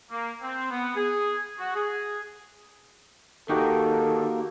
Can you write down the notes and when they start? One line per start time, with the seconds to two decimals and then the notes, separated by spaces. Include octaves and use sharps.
0.11 A#3
0.42 C4
0.70 B3
0.96 G#4
1.59 F#4
1.75 G#4
3.49 D#3 A#3 D#4 F#4 G4 A4